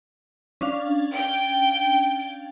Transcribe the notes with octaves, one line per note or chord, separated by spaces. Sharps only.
C#4 D4 F5
G5